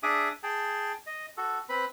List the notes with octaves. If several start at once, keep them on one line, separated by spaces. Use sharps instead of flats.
D4 G#4 E5 D6 D#6
G#4 G5 A5
D#5
F#4 A4
C4 B4 B5